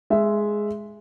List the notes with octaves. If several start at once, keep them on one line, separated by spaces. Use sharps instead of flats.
G#3 E5